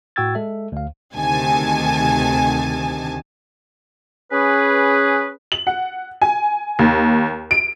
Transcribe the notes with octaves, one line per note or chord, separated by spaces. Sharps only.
A2 F#4 G5 E6 G#6 A6
G#3 A4 E5
D2 F5
D2 C3 D#3 G#5 A5
C#4 G#4 B4
F#7
F#5
G#5
D#2
D7